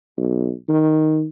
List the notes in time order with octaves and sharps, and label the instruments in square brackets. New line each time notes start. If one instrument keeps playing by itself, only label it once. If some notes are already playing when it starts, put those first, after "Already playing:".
[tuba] B1
D#3